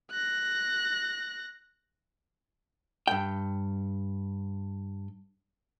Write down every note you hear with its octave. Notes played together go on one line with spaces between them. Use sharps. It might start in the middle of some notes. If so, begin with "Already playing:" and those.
F#6 A#6
G2 G5